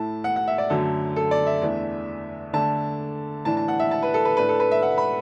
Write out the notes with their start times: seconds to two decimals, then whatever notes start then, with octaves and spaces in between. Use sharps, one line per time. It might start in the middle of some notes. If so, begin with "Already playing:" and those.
Already playing: A2 A3 E4 A5
0.24 F#5
0.36 F#5
0.48 E5
0.58 D5
0.70 F#2 D3 F#3 A3 A4
1.16 A4
1.31 D5
1.47 E5
1.62 E2 E3 A3 D4
2.53 D3 A3 D4 A5
3.45 A2 E3 D4 A5
3.57 A5
3.68 F#5
3.80 E5
3.91 A5
4.03 B4
4.14 A4
4.25 B4
4.37 A2 A3 D4 B4
4.49 A4
4.60 B4
4.72 E5
4.82 F#5
4.98 B5